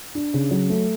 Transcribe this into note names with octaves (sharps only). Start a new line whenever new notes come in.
D4
C#3
F#3
A3